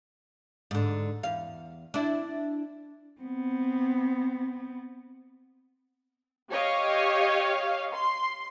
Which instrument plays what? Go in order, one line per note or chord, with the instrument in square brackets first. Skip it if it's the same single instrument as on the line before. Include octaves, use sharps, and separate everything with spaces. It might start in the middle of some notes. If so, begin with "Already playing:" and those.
[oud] G#2 D3
E2 F5
D4 E4
[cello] B3 C4
[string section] G4 C#5 D#5 F5
C6